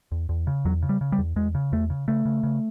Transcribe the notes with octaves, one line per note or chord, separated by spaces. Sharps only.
E2
E2
C#3
E2 F#3
C#3
G3
C#3
G3
E2
E2 G#3
C#3
E2 A3
C#3
C#3 A3
C#3
C#3